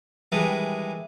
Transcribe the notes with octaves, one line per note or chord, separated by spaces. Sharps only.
D#3 E3 G3 G#3 D4